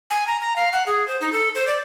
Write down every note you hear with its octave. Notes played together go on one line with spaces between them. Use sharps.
G#5
A#5
A#5
F5
F#5
G#4
C5
D#4
A4
C5
D5